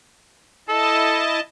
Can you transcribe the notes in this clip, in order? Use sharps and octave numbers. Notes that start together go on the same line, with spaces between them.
E4 A4 D#5 A5